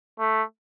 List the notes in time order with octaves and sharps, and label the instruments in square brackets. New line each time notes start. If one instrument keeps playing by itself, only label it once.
[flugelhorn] A3